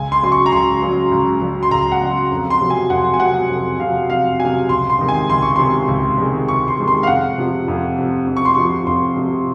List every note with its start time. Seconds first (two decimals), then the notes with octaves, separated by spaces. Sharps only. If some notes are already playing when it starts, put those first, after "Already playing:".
Already playing: C#2 G#5
0.12 C6
0.23 C#3 F#3 C6
0.32 C#6
0.46 A#5
0.52 C#2 C6
0.82 C#3 F#3
1.12 C#2
1.41 C#3 F#3
1.63 C6
1.71 C#2 A#5
1.92 F#5
2.02 C#3 F#3
2.32 F2
2.50 C6
2.61 C3 F#3
2.70 G#5
2.90 F2 F#5
3.14 G#5
3.20 C3 F#3 F#5
3.50 F2
3.79 C3 F#3 F5
4.10 F2 F5
4.40 C3 F#3 G#5
4.69 C#2 C6
4.90 C6
4.99 C3 D#3 G#3
5.08 G#5
5.30 C#2 C6
5.43 C#6
5.56 C3 D#3 G#3 C6
5.88 C#2
6.18 C3 D#3 G#3
6.48 C#2 C#6
6.68 C6
6.78 C3 D#3 G#3
6.88 C6
7.03 F5
7.07 F2 F#5
7.38 C3 F3
7.68 F2
7.97 C3 F3
8.27 F2
8.37 C#6
8.45 C6
8.55 C3 F3 C#6
8.87 F2 C6
9.17 C3 F3